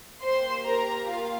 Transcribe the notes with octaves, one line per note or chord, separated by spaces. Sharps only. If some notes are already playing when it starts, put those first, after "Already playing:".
A#3 G4 C5 C6
A#4 A#5
F4 F5